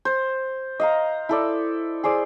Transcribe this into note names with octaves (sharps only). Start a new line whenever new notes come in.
C5
D#5 F5 A#5
E4 A4 D5
G#4 C5 D5